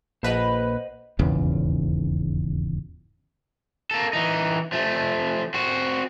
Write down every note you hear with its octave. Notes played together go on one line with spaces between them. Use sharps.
A#1 B4 C5 D#5 F#5
D#1 G#1 E2 C#3
A#3 A4
E3 D#4
F3 A3
C4 F#4